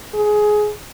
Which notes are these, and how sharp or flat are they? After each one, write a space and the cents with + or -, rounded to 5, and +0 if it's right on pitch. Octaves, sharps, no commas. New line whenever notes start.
G#4 +15